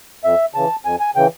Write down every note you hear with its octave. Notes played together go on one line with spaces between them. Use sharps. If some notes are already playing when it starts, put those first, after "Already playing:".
F2 E5
C#3 E3 A5
F2 G#5
G#5
C#3 E3 G5